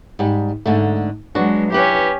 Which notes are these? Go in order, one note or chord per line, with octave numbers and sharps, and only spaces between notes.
G#2 G3
G#2 D3 A3
F#3 G#3 B3 D4 F#4
C#4 E4 G4 B4